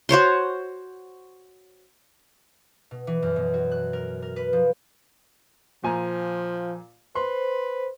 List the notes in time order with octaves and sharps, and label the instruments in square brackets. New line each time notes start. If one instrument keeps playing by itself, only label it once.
[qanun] F#4 C5 C#5 C6
[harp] B2
E3
F#2
B2
F#4
F#6
A#4
A#4
B4
F3
[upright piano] A#2 G#5 A#5 [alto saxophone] F3
[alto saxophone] B4 [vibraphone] C5 [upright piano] C6